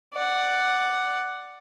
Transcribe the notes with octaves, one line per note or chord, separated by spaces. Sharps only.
D5 F#5